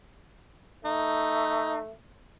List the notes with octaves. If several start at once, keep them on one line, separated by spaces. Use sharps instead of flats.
A3 D#4